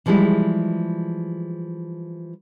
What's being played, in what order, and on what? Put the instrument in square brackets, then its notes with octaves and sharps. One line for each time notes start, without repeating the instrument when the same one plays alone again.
[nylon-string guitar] E3 F3 G3 G#3 E4